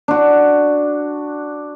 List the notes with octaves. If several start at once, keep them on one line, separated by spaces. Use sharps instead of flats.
D4 F#4